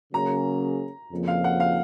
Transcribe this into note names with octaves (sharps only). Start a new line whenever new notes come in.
C#3 F#3 A#3 C#4 G#4 A#5
F2 C#3 F3 A#3
F5
F#5
F5